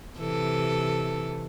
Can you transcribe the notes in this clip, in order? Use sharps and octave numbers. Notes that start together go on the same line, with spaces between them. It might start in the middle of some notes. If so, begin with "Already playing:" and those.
C3 E3 A4